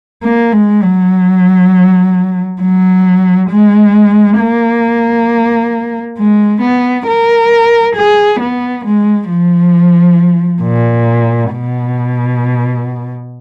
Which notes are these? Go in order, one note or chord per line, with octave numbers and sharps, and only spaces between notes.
A#3
G#3
F#3
F#3
G#3
A#3
G#3
B3
A#4
G#4
B3
G#3
F3
A#2
B2